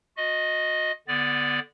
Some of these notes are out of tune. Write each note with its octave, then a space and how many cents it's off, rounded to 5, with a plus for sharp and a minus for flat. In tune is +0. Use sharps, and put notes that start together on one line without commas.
F#4 -40 D#5 +0
D3 -15 B3 +0 D5 +0